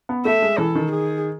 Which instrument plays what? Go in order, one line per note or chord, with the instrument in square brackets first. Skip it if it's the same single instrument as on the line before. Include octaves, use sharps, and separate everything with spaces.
[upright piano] B3
[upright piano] A3 [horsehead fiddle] E5
[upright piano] G#3
[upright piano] E3 [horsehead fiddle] A4
[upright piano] D#3
[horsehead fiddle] G#4